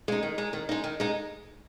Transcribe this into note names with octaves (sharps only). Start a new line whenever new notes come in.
G#3 D#4
D#3
G#3 D#4
D#3
G#3 D#4
D#3
G#3 D#4